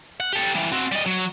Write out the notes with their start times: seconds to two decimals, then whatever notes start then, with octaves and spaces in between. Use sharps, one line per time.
0.20 F#5
0.33 G4 A4
0.55 E3 G3
0.72 C4 F#4
0.92 G3 D#5
1.06 F#3